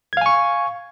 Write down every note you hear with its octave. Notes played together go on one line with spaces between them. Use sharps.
F5 G#5 C#6 G#6